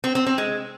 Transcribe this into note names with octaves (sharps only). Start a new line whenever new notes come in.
C4
C4
C4
G#3